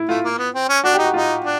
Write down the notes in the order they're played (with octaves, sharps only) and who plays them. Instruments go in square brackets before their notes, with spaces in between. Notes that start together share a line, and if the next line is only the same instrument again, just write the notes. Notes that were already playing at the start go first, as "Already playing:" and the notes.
Already playing: [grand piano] E4
[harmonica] A3 [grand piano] F4
[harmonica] A#3
B3
C4
C#4
[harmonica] D4 [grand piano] F#4
[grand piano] G4
[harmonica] D#4
[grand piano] F#4
[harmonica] D#4 [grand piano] F4
[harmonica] D4